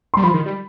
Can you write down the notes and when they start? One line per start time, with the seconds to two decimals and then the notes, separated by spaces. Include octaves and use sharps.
0.14 G3 C6
0.23 F3 B5
0.34 D#3
0.46 G3